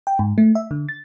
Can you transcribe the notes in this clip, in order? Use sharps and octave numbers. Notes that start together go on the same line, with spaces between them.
G5
G#2
A3
E5
D3
A6